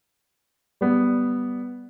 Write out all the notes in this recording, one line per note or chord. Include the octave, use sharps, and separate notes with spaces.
G3 B3